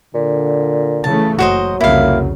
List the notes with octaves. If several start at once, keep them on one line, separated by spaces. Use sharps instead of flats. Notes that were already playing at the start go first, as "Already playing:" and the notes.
A#2 D3
C#3 E3 A3 A5
F#1 F#3 F#4 C5 D#5
C2 F2 C#3 A#3 E4 F5